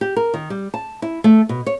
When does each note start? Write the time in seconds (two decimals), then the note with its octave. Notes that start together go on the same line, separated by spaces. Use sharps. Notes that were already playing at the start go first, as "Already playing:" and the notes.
0.01 G4
0.16 A#4
0.34 D#3
0.50 G3
0.74 A5
1.02 E4
1.24 A3
1.49 B2
1.66 C#5